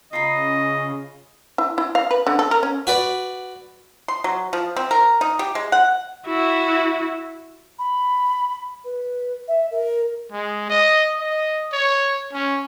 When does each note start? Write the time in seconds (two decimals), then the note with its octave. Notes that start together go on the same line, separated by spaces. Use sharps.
0.13 C#3 F4 D#5 A#5 B5
1.58 E4
1.78 E4
1.95 F5
2.11 B4
2.27 D3
2.39 A4
2.51 A#4
2.63 C#4
2.87 F#4 B4 D5
4.08 C6
4.24 F#3
4.53 F3
4.77 C4
4.91 A#4
5.21 D#4
5.39 G4
5.55 G#3
5.72 F#5
6.26 E4 F#4
7.79 B5
8.85 B4
9.48 E5
9.71 A#4
10.32 G#3
10.70 D#5
11.19 D#5
11.73 C#5
12.33 C#4